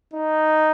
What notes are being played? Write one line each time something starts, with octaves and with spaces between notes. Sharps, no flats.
D#4